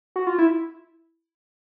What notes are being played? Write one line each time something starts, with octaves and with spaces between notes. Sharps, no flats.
F#4
F4
E4